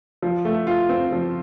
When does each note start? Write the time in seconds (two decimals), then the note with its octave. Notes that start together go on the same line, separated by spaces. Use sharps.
0.22 F3
0.45 A3
0.67 F4
0.89 C4
1.12 F3